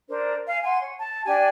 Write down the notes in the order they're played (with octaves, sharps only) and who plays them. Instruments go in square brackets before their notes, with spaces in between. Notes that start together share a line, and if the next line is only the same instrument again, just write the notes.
[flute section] D4 A#4 C5
F5 G#5
F#5 G#5 C6
C#5
A5
D4 G4 G#5